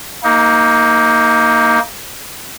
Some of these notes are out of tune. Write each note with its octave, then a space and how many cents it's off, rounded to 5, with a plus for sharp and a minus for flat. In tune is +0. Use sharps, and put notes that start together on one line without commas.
A#3 +0 D#4 +25